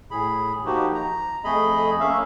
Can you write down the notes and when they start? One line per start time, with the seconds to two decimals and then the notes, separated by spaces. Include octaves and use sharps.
0.11 A2 G#4 B5
0.65 F3 A#3 D#4 F#4 G4
0.94 A#5
1.44 F2 A3 G#4 D#5 B5
2.00 A3 A#3 C#4 E5 F5